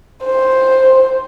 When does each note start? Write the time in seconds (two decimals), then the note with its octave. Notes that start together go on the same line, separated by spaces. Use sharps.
0.25 C5